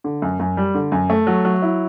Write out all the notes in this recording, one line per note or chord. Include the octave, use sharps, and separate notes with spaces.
D3
F#2
F#2
G3
D3
F#2
A3
F#3
F#3
E4